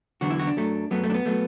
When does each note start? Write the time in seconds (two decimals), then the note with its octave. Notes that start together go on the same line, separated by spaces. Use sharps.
0.21 E2 D3 F#3 F#4
0.30 E4
0.39 F#4
0.47 D4
0.56 F#2 F#3 A3
0.91 F#2 F#3 A3 B3
1.04 A3
1.10 D4
1.14 B3
1.26 F#3 A3